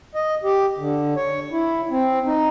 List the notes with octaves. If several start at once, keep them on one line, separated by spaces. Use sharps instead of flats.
D#5
G4
D3
C#5
E4
C4
D#4